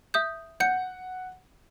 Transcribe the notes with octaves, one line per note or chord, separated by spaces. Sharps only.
E5 D#6 G6
F#5 G6 C#7